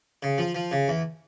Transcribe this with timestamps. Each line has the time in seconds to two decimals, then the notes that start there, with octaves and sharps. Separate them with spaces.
0.23 C#3
0.38 F3
0.55 F3
0.71 C#3
0.88 E2